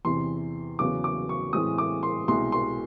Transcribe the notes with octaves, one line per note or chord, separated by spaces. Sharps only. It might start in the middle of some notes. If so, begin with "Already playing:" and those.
E2 C3 E3 C6
E2 C#3 F#3 B3 D6
D6
C#6
A2 E3 G#3 C4 D#6
D6
C6
C2 B2 G#3 C6
C6